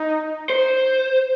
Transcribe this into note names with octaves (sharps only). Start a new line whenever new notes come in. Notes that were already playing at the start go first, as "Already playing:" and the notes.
Already playing: D#4
C5